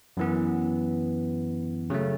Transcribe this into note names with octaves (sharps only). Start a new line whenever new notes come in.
F#2 E3 B3
C#3 F#3 A3